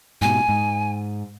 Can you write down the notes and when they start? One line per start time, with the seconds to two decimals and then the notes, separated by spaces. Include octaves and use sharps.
0.22 G#2 B2 G#5
0.49 G#2